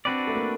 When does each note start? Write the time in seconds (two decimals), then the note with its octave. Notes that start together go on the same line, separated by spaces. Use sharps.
0.05 C4 D4 F#4 B4 D5
0.27 A3
0.35 A#3